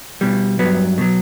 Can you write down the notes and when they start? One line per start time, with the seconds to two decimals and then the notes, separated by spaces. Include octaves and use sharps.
0.21 B2 G3
0.59 G2 F#3 B3
0.98 B2 F#3